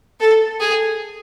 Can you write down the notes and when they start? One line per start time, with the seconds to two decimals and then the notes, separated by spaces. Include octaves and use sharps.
0.20 A4
0.60 G#4